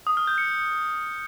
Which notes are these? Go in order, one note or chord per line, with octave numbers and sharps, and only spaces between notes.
D#6
F6
G6
C#7